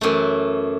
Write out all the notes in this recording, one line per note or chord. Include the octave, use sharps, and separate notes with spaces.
F#2 E3 A3